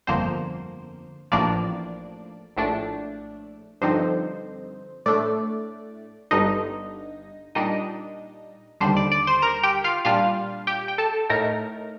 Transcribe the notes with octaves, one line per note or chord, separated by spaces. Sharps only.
G1 F2 D3 F3 A#3 C5
A1 A2 F3 A#3 D4 D5
A#1 A2 A3 D4
G2 D3 F3 C4 D#4 C5
A2 A3 D4 D5
G1 G2 D3 D#4 D#5
A#2 G3 D4 D#4 D#5
D#2 D3 G3 D4 C5
D5
D5
C5 C6
A#4 A#5
G4 G5
F4 F5
A#2 G3 D4 F4 F5
G4 G5
G5
A4 A5
A2 A3 D#4 A#4 A#5